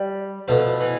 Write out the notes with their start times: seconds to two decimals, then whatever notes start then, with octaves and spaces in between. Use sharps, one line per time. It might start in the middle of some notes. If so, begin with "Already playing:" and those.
Already playing: G3
0.48 B2 F3 A3 E4 B4
0.80 E3